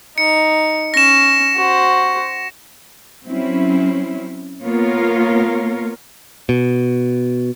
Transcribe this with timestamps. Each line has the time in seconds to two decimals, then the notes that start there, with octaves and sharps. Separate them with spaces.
0.18 D#4 C#7
0.94 C#4 A#6 E7
1.56 F#4 C5
3.26 F#3 C4 C#4 E4
4.64 A#3 B3 F4 A#4 C#5
6.49 B2